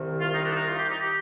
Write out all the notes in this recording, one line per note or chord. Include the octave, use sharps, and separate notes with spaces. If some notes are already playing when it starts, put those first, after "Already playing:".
Already playing: C2 C3 D#3
F4
D#4
D4
D#4
F4
G4
D#4
G4